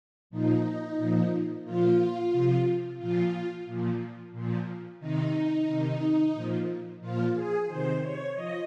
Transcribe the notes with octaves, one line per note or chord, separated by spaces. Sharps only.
A#2 F3 D#4
A#2 F3
A#2 F3 F4
C3 F3
A#2 F3 F4
A#2 F3
A#2 F3
C3 D#3 D#4
C3 D#3
A#2 F3
A#2 F3 F4
G#4
C3 D#3 C5
C#5
F3 D#5